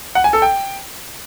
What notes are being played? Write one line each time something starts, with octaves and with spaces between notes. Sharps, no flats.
F#5
G#5
A4
G5